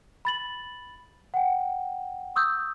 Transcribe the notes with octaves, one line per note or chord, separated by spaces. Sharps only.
B5 A6 F#7
F#5 G5
C#6 D#6 E6 G6